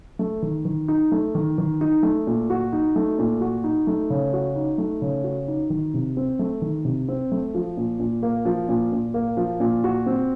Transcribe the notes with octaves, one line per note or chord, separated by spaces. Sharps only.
A3
D#3
D#3
D#4
A3
D#3
D#3
D#4
A3
A#2
F#4
D#4
A3
A#2
F#4
D#4
A3
C#3
F#4
D#4
A3
C#3
F#4
D#4
D#3
C3
C4
A3
D#3
C3
C4
A3
F3
A#2
A#2
A#3
F3
A#2
A#2
A#3
F3
A#2
F#4
C4